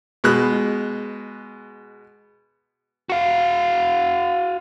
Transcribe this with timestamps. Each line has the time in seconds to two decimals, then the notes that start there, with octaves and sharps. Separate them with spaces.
0.24 B2 G#3 F#6
3.10 F#4 F5